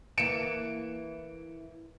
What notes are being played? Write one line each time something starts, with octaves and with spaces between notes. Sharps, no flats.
E3 A#3 C#7 D7 E7